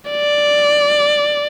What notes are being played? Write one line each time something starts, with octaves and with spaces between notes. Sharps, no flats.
D5